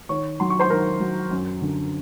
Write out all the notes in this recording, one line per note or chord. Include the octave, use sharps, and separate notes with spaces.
D#3 C#5 C#6
F#3 C6
C#6
C5 C6
D#3 A#4 A#5
F#3
F#2
D3